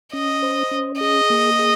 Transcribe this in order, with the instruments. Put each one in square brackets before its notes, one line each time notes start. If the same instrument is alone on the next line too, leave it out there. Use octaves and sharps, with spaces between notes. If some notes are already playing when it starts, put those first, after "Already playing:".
[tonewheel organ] C#4 [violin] D#5
[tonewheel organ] C5
C#4
[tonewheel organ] G#4 [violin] D#5
[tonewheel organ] A#3
G#4